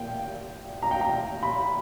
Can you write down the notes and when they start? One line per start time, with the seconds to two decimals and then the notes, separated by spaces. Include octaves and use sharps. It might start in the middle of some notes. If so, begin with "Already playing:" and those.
Already playing: A#2 A#3 G5
0.82 A#5
0.91 G5
1.01 A#5
1.43 B5